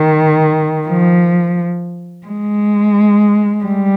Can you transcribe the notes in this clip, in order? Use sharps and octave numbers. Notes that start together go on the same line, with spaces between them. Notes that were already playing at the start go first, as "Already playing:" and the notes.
Already playing: D#3
F3
G#3
G3